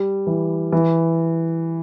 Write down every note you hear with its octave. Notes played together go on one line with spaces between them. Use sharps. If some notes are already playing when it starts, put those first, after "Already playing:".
Already playing: G3
E3
E3